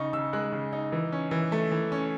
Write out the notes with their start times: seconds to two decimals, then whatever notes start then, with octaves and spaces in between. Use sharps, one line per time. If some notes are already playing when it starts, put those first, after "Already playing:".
Already playing: C#3 D#4 C#6
0.13 C#3 E6
0.33 G#3 F#6
0.52 C#3
0.73 D#4
0.92 E3
1.12 C#4
1.31 E3
1.52 A3
1.72 E3
1.92 C#4